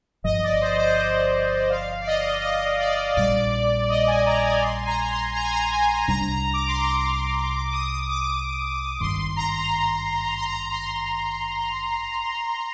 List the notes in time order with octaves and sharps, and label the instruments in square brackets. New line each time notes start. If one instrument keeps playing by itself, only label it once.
[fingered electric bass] G1 G2 F3 [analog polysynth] D#5
[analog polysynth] D5
C5
C5
D#5
F5
D5
D#5
D#5
D5
[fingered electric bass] A#1 A#2 G3 [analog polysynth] D5
[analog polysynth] D#5
G#5
A#5
G#5
C6
G#5
A#5
C6
A#5
G#5
A#5
G#5
[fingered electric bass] C2 C3 G3 D4 [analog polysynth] A#5
[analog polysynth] D6
C6
A#5
D6
D#6
D#6
D6
[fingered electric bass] G#1 G2 D#3 [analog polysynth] C6
[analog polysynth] A#5
C6
A#5
C6